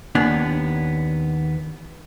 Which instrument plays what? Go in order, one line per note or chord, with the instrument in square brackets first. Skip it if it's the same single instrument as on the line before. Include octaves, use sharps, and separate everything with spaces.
[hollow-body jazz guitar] D#2 B3 C#4 D4